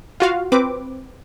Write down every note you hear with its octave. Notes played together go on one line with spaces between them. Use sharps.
F4 F#4 F5
C4 B4 D6